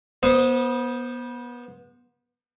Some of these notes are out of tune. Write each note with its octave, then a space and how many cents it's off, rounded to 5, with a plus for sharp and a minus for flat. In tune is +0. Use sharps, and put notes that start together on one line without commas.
B3 -30 C5 +0 D#6 +0